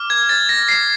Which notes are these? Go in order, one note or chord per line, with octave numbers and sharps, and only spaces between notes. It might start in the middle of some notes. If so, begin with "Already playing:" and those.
Already playing: D6 F6
G#6
A6
A#6
C7